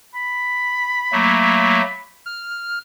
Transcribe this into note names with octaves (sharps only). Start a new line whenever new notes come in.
B5
F#3 A3 A#3
F6